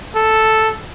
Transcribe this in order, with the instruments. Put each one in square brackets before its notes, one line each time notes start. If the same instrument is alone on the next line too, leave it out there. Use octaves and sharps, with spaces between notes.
[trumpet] A4